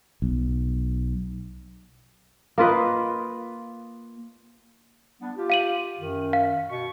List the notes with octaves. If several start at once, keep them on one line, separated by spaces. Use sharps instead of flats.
B1
A#3 F4 B4 D#5
G3 B3 D4
F4 G4
F5 D#7 F#7
F#2 D#3
F5
B2 C#6